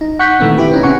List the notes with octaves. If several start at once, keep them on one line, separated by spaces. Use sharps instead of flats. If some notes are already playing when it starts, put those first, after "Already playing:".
D#4
F#5 C#6 F#6 G6 B6
A#2 D#3 E3 A3 B3 C4
E4 G4 B4
C4 C#4 D#4
C#3 C#4 F#5 G#5 C#6